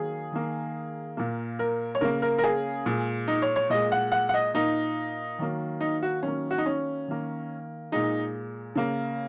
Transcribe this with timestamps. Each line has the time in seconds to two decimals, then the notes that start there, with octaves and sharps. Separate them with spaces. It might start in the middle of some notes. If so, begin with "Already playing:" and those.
Already playing: D#3 F#3 A#3 G#4
0.32 D#3 A#3
1.17 A#2 A#3
1.59 A#4
1.95 C#5
2.01 C#3 A#3 A#4
2.22 A#4
2.38 A#4
2.44 G#4
2.86 A#2 G#3
3.28 D#4
3.42 C#5
3.56 C#5
3.70 A#2 G#3 D#5
3.92 F#5
4.12 F#5
4.29 F#5
4.34 D#5
4.54 A#2 A#3 D#4
5.39 D#3 F#3 A#3
5.80 D#4
6.02 F#4
6.23 D#3 F#3 A#3 C#4
6.51 F#4
6.58 D#4
6.66 C#4
7.08 D#3 A#3
7.92 A#2 G#3 D#4
8.76 C#3 A#3